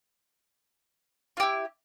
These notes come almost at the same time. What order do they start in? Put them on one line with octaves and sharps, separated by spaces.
F4 G4 E4